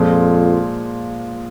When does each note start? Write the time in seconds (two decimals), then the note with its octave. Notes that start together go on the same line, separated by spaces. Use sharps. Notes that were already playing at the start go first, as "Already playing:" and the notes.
Already playing: F2 A#2 F3 G#3